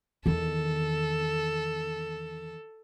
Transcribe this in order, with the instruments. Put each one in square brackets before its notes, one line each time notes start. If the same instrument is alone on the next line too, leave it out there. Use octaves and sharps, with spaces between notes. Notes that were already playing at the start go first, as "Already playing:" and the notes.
[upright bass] E2 D#3 [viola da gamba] A4